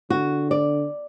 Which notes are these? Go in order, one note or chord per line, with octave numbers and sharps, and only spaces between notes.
D3 F#4
D5